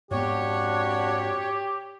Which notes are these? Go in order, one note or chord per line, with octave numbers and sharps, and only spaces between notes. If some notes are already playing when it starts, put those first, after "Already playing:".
F2 G#2 B3 D4 F#4 G4 C#5